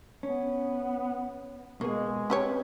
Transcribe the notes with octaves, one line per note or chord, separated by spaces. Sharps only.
B3 C#4
B2 G#3 A#3 B3 G#4
C4 C#4 G4 B4 C#5